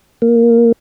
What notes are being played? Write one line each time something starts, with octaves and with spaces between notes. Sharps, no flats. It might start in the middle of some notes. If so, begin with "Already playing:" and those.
A#3